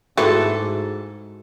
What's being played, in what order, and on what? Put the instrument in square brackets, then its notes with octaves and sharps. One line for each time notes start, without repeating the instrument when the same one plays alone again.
[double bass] G#2 [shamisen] A3 E4 B4 [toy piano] F#4 G#4 [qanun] A4 A5